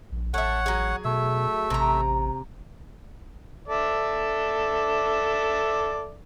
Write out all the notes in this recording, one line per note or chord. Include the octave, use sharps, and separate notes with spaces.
A#1
A1 A4 C#5 E5 F#5
F#3 G#4
B2 A3 E5
A1 C3 A#5
A4 D5 E5